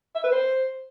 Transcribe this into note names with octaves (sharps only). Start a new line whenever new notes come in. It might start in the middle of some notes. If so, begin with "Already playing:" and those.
E5
B4
C5